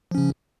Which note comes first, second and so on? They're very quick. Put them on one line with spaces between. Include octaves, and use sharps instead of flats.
F3 C#4 C#3